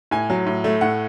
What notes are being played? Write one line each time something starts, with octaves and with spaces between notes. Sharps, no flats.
A2 G#5
F#3
A2
A3
A2 F#5